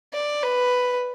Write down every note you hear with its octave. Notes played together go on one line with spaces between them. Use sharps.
D5
B4